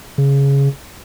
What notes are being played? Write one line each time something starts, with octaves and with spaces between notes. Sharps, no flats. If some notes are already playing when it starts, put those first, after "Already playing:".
C#3